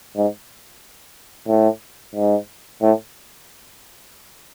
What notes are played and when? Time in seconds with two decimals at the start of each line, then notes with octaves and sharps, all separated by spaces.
0.16 G#2
1.48 A2
2.15 G#2
2.82 A2